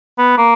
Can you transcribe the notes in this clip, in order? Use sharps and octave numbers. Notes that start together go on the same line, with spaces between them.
B3
A#3